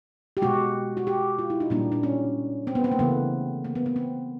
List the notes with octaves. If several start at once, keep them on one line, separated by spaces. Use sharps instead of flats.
G4
B2 G#3 F#4
F#4
G4
F4
E4
D#4
A#2 G3 A#3 D4
D4
C#4
C4
B3
C4
A#3
C#3 E3 A3 B3
A#3
B3
B3
C4